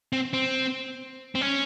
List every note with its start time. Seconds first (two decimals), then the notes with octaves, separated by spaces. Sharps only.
0.13 C4
0.33 C4
1.35 C4
1.41 C#4